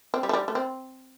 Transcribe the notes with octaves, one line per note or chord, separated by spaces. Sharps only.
C4
G3
A3
G3
A3
C4